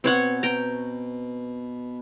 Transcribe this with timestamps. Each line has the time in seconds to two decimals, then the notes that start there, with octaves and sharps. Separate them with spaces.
0.04 B2 C4 B4 C#5 F#5
0.43 B4 G5 A#5